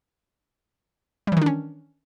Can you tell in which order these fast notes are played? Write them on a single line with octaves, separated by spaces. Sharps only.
G3 E3 D#3 D4 C#4